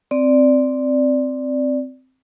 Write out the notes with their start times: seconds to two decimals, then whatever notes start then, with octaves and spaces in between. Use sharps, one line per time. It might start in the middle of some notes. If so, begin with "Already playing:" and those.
0.11 C4 D5